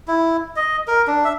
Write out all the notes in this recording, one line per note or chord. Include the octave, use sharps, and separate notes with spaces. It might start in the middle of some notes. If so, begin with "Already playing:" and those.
E4
D#5
A#4
D4
E5